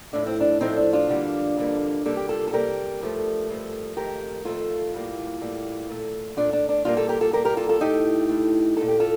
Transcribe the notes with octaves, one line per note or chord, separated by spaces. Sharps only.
A2 F3 A3 D4
C4
D4
A2 F3 A3 C4 D#4
D4
D4 F4
F2 D3 G3 A#3
F2 D3 G3 A#3
C3 G3 A#3 A4
G4
F4 A4
A4
C3 G3 A#3 G4 A#4
G2 F3 A3
G2 F3 A3
F2 D#3 A3 G4 A#4
F2 D#3 A3 F4 A4
A2 G3 A#3
A2 G3 A#3
A#2 A3
A#2 A3 D4 F4
D4
D4
A#2 G3 A#3 D4 F4
F4 A4
G4 A#4
F4 A4
A#2 G3 A#3 G4 A#4
G4 A#4
F4 A4
F4 A4
A2 A3 D#4 G4
A2 A3
A#2 A3 A4
G4
F4 A4